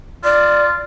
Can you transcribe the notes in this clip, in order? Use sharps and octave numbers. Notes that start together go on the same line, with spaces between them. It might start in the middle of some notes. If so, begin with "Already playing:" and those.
F4 D5